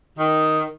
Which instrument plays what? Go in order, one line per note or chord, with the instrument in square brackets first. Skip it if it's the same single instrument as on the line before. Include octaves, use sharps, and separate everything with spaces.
[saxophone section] D#3